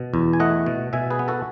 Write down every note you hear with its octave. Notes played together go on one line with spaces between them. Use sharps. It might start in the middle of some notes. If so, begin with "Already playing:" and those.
Already playing: B2
E2
G#5
A3 D#5 F#5
B2
B2 E5 G#5
G#4 B4
B3
F#4 A4